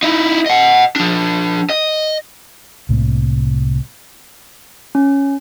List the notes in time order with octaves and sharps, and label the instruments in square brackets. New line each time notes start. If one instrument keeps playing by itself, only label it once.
[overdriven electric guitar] D#4 E4
D#5 F#5
F3 D4
D#5
[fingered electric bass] C2 A2 C3 A#3
[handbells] C#4